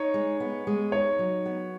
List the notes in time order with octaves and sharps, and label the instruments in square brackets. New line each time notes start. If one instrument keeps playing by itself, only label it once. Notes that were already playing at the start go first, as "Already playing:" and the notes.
Already playing: [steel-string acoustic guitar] D#4 [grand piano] C#5
[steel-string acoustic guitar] G#3
B3
G#3
[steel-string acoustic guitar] D#4 [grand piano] C#5
[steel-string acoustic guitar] F#3
B3